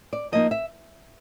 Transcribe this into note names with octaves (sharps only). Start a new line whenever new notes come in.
D5
F3 A#3 D#4 D#5
E5